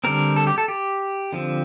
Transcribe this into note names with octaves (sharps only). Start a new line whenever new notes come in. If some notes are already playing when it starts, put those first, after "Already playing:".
D3 G3 C4 A#4
A4
G4
A4
G4
D3 F3 C4